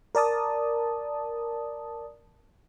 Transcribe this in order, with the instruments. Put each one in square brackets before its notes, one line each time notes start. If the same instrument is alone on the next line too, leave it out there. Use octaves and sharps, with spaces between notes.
[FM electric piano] A#4 D5 A5 D#6